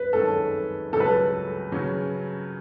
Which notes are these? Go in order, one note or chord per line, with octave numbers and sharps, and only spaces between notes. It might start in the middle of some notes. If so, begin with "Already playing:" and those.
Already playing: B4
F#2 D#3 G#3 C#4 A4
C#2 C#3 F#3 A4
B4
A4
C#3 F#3 C#4